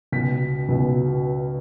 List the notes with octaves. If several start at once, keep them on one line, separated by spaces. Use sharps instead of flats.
C#2 B2 B6
C#2 B2